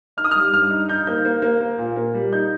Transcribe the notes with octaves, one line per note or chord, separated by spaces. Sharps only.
D#4 F6
D#6
G3 F6
G2 F6
D#4
D#4 G6
A#3 G6
A#3
A#3
A#3
A#2
A#3
G3
D#4 G6